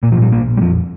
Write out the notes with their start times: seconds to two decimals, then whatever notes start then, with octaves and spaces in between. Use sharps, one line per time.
0.03 A#2 A#3
0.12 F3
0.17 A#2 G3
0.32 A#1 A#3
0.47 A#1
0.57 G3
0.61 F2 F3